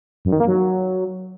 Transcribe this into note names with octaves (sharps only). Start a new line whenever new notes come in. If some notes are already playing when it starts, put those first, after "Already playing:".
F#2
D#3
A#3
F#3